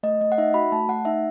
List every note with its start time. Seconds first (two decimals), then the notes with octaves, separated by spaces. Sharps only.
0.03 A3 D#5
0.21 A3 D#5
0.32 F#5
0.38 D#4 E5
0.54 F#4 B5
0.72 A3 A5
0.88 A3 F#5
1.05 D#4 E5